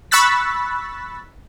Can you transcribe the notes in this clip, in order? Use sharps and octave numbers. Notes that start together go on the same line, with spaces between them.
B5 C#6 E6 F#6 A6 B6